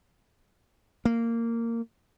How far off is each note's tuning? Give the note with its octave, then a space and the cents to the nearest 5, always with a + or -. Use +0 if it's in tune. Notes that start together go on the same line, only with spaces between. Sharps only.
A#3 -15